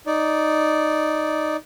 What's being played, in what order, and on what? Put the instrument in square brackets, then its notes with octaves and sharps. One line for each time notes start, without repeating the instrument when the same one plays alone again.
[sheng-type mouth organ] D#4 D5